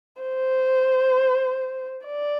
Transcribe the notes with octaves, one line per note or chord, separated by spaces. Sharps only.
C5
D5